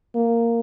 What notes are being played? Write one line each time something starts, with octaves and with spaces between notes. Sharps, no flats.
A#3